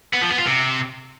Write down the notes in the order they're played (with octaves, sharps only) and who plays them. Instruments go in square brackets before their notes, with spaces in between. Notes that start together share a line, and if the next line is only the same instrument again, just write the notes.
[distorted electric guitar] B3
F3
B3
F4
C3